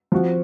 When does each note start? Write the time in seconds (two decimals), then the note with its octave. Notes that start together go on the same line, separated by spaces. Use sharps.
0.12 F3 C4 F#4